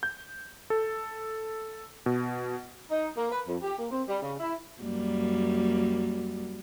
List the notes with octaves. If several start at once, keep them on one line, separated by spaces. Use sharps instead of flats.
G6
A4
B2
D#4
A#3
B4
F2
G4
A#3
C4
G3
C#3
E4
F#2 G3 A#3